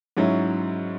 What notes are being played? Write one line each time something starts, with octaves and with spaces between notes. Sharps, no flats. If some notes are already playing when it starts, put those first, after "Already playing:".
G#2 F#3 C#4 E4